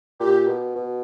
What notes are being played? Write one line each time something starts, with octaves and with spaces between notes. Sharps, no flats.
A#2 G4
B2
B2